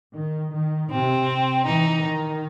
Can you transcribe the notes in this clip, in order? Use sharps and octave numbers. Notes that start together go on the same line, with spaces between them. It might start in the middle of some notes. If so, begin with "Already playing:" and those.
D#3
D#3
C3 C4
E3 D#4
D#3